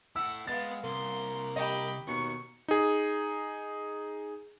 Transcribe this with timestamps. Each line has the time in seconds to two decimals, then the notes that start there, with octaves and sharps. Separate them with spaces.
0.16 E4 A4 F#5 E6
0.47 G#3 B3 F5 A6
0.84 C2 A#3 C6
1.56 G4 D#5 B5
2.07 D#2 B2 C#6
2.68 D#4 G#4